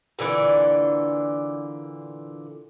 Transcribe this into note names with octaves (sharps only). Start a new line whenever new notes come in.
A#2 D3 E3 D5